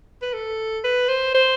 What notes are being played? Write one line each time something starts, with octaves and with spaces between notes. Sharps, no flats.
B4
A4
B4
C5
C5